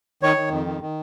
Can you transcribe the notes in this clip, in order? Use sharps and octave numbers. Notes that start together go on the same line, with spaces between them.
D#3 C#5
D#3
F2
D#3
D#3